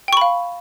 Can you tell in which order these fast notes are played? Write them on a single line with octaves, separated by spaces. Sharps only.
G5 C#6 B5 F5